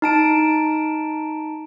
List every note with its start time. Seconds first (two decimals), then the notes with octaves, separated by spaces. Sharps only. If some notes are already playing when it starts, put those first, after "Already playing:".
0.02 D#4 A5 D7